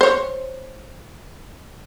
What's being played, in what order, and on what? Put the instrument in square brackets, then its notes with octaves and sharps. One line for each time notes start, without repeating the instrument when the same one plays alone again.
[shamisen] C5 C#5